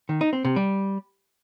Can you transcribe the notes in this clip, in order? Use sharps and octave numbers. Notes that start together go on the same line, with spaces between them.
D#3
D#4
C4
C3
G3